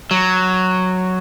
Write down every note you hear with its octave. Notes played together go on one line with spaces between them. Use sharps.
F#3